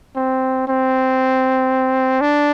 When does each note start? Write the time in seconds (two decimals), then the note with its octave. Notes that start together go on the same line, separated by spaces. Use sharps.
0.16 C4
0.68 C4
2.21 D4